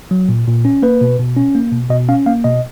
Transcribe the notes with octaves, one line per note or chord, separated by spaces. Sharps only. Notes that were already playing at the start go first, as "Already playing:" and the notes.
F#3
A#2
A#2
C#4
A#3 B4
B2
B2
C#4
A#3
B2
B2 D#5
C#4 F5
A#3 F5
B2 D#5